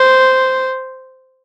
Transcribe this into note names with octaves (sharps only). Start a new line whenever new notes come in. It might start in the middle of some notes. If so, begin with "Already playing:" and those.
Already playing: C5